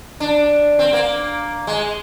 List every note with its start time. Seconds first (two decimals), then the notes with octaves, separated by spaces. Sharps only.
0.20 D4
0.79 C4
0.93 A#3
1.67 G#3